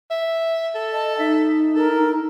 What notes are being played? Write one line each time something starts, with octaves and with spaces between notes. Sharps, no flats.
E5
A4
D#5 A5
D#4 E5
A4 A#4